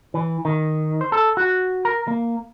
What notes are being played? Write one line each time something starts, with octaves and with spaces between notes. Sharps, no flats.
E3
D#3
C5
A4
F#4
A#4
A#3